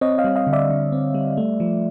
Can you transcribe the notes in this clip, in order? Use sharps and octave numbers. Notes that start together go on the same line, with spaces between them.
C4 C#5 D#5
D#5 F5
G3
D#5 F5
D3
D5 E5
D3
C4
G3
A3
F3